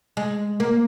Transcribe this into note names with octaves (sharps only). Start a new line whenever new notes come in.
G#3
A#3